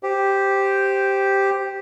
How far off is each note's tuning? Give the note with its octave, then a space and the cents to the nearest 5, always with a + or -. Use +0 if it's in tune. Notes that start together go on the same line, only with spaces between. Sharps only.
G4 +0 C5 +0